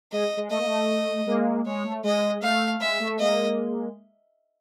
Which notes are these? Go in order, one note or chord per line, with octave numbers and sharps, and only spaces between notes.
G#3 D#5
G#3
A3 D#5
A#3
A3
G#3 A#3
G#3 C#5
A3
G#3 D#5
A3 F5
G#3 E5
A3
G#3 A#3 D#5